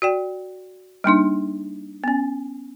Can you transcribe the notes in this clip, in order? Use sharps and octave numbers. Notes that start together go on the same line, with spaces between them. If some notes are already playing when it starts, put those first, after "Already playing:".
F#4 D5 G5
G3 A#3 D4 D#4
B3 C#4